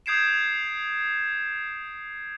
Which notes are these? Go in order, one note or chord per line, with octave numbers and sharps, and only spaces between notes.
D#6 G6 G#6 C7 D7 E7